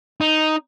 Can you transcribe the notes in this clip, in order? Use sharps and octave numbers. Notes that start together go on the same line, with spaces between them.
D#4